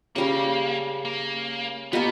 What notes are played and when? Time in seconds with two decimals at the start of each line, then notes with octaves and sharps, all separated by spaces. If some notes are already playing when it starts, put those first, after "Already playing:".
0.15 C#3 G3 A#3 C#4
1.05 A#3
1.92 B2 G3 A#3 B3